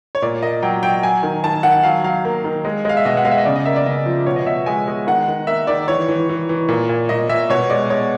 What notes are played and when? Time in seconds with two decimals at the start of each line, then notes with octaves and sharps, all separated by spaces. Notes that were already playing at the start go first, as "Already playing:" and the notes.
0.15 C#5
0.22 A#2 D5
0.42 A#3 D#5
0.63 F#3 G5
0.83 F#3 G5
1.03 F#3 G#5
1.23 D#3
1.44 D#3 A5
1.63 D#3 F#5
1.83 F#3 F5
2.04 F#3 F5
2.25 A#3
2.44 D#3
2.65 G#3
2.85 G#3 F5
2.97 E5
3.05 B2 D#5
3.17 F#5
3.25 G#3 F5
3.31 E5
3.38 D#5
3.45 C#3 D5
3.56 D#5
3.65 A#3 E5
3.76 D5
3.86 C#3 D#5
4.06 F3
4.26 B2 C#5
4.36 D#5
4.46 B2 E5
4.66 G#3 G#5
4.88 G#3
5.07 D#3 F#5
5.28 D#3
5.47 A#3 E5
5.67 D#3 D5
5.88 E3 C#5
6.08 E3
6.29 E3
6.49 E3
6.68 A#2
6.89 A#2
7.09 A#2 D#5
7.29 A#2 E5
7.50 B2 C#5
7.70 G#3 D5
7.90 G#3 C#5